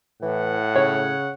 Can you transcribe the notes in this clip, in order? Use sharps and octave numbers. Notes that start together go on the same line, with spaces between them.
A2 E3 F#5
C#3 C#5